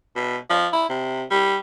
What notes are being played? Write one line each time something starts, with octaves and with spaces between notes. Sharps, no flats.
B2
F3
E4
C3
G3